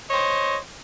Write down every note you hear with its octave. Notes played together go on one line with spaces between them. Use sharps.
C5 C#5 D#5